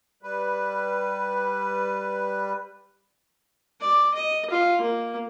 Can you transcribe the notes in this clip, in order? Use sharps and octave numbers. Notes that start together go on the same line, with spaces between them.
G3 B4
D5
D#5
F4
A#3